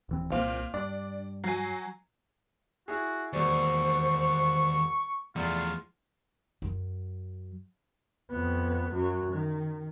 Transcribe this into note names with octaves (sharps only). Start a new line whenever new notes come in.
D#1 E3 C4
C2 A#2 C4 F5
G2 D4 D5
F#3 G#5 C7
E4 F#4 G#4
E1 D#2 C5 D5 C#6
E2 F3 A3 F4 D5
F#2 F#3
F2 B3
F#2 F#3
D#3